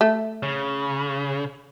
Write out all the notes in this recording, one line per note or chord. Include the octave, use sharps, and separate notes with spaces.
A3
C#3